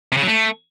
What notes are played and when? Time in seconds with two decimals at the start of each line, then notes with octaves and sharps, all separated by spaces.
0.12 C3
0.17 C#3
0.22 F#3
0.27 A3